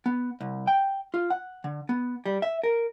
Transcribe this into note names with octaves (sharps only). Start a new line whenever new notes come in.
B3
C2
G5
F4
F#5
D3
B3
G3
E5
A#4